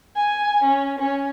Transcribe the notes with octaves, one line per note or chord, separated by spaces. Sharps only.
G#5
C#4
C#4